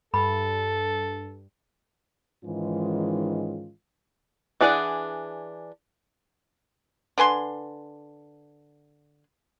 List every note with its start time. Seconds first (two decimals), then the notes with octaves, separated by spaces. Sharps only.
0.14 G2 A4 B5
2.45 G#2 D#3 E3 G#3 C#4 F4
4.61 E3 D4 G#4 D5 F#5
7.18 D3 B4 G#5 C6